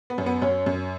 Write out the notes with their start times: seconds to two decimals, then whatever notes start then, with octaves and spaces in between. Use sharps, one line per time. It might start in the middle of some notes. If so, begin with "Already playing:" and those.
0.10 B3
0.18 F#2
0.26 B3
0.42 F#2 C#4
0.66 F#2